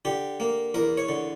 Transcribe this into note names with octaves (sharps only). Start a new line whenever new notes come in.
D3 G4
A#3
E2 A#4
C#5
D3